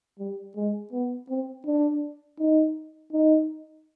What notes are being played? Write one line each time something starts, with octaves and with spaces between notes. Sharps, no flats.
G3
G#3
B3
C4
D4
D#4
D#4